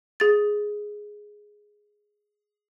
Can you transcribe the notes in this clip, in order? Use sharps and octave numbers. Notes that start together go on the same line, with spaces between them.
G#4 A6